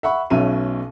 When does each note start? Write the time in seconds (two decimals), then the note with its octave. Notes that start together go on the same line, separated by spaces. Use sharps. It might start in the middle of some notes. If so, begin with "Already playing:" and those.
0.03 E5 F#5 B5 C#6
0.30 B1 B2 C#4 E5 D#7